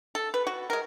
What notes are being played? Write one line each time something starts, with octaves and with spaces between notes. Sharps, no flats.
A4
B4
F#4
G#3 A#4